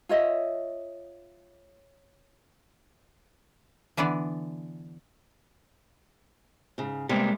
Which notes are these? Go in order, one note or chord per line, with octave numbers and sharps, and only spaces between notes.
F4 C#5 D#5 E5
D3 E3 B3 D4 D5
G#2 C#3
C3 G3 G#3 A#3 B3